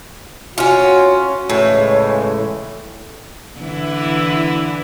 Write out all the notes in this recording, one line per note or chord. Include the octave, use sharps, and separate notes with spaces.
C#4 F4 F#4 C#5
A2 C#3 E3 G#3 C#5
D3 E3 E4